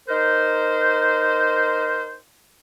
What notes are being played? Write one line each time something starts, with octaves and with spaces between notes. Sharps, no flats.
D#4 A#4 C5